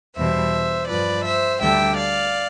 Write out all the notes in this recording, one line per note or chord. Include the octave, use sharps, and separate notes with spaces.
E2 B2 G3 C5 E5
G2 F3 B4 D5
C5 E5
D2 D3 G3 E5 G5
D5 F5